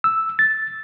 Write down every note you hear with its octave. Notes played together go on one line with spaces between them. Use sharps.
E6
A6